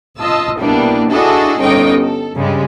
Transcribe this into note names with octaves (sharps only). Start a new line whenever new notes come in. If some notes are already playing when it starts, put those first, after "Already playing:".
F4 D#5 A5 E6
B2 G3 A#3 B3 D4 E4
D4 E4 F#4 G#4 A4 D#5
G1 C#4 D#4 D#5 G5
A4
G2 C#3 G3 G#3